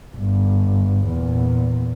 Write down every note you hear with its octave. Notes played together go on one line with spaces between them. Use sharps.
G1
E2 A#2